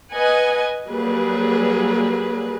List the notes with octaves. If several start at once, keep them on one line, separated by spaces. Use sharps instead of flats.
B4 D#5 F#5 G#5
F#3 G3 A#3 G#4 B4